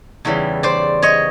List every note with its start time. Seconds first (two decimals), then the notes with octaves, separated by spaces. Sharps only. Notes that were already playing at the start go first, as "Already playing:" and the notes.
0.25 E2 C#3 E3 G3
0.63 C5 D5
1.02 C#5 D#5